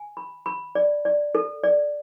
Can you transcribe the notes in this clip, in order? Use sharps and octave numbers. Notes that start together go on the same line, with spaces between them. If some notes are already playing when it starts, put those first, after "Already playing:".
Already playing: G#5
B5
B5
D5
D5
A4
D5